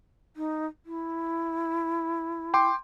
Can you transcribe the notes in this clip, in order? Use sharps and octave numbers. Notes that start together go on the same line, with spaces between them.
D#4
E4
G5 C6 D6